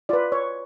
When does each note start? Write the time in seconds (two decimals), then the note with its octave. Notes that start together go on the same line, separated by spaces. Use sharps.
0.09 F4 B4 D5
0.32 C#5